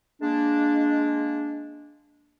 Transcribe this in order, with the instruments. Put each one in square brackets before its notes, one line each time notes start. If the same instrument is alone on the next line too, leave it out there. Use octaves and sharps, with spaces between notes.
[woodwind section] G#3 A#3 D4